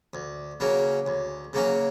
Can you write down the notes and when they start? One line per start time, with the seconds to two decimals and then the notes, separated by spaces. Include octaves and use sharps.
0.14 D2
0.60 C#3 F#3 A#3 C#4
1.06 D2
1.53 C#3 F#3 A#3 C#4